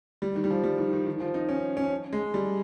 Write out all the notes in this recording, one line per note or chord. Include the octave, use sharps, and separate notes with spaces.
G3
D#3
G3
F3
G3
D#3
D#3
D#3
F3
D#4
C#4
C#4
G#3
G3